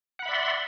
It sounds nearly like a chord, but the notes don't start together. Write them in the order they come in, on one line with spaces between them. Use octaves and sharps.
F#5 B5 E5 D5 C6